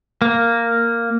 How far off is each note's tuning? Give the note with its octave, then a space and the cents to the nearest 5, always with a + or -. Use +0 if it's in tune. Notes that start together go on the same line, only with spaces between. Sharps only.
A#3 -5